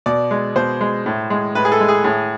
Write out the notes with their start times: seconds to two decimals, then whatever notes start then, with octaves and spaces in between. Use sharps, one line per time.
0.06 B2 D5
0.31 G#3
0.56 B2 C5
0.81 G#3
1.06 A2
1.30 G#3
1.55 A2 B4
1.65 G#4
1.72 A4
1.80 G#3
1.89 G#4
2.04 A2 G#4